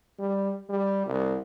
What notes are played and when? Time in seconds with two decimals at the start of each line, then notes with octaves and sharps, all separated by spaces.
0.19 G3
0.69 G3
1.07 C2